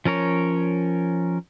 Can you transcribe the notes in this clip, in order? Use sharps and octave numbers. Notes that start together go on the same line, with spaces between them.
F3 C#4 A#4 C#5